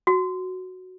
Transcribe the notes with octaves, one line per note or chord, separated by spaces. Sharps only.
F#4